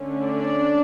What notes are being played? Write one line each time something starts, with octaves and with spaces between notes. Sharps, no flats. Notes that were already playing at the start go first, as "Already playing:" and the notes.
Already playing: D3 A3 C#4
D4 D5